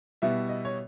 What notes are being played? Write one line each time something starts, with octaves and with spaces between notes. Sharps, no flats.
B2 G3 B3 E4 E5
D#5
C#5